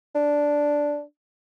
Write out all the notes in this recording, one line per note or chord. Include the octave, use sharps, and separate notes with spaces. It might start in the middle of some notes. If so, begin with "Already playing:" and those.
D4